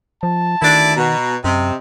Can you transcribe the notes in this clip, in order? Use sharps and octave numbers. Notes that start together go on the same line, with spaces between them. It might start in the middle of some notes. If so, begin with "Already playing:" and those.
F3 A5
D2 D#3 E4 D5
B2 A#5
F#2 C3 D#5